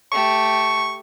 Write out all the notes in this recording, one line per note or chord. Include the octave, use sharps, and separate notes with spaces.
A3 G4 C#6